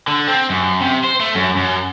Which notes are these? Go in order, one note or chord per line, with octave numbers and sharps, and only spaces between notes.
D3
C4
F#2
C3
C5
A3
F#2
F#2